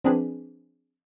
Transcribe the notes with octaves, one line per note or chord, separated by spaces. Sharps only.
F3 C4 D4 G#4 B4